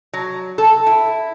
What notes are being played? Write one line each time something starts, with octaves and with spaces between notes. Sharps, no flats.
F#3
A4
E4